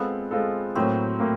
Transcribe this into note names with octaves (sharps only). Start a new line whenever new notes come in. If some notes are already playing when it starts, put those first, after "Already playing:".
Already playing: G#3 B3 C4 F4 A4
G#3 C4 F4 A4
A2 F#3 A#3 C4
A2 A#3